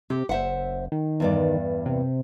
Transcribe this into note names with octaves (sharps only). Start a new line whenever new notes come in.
C3 G4
F#1 C5 E5 F#5
D#3
E2 G2 D5
C3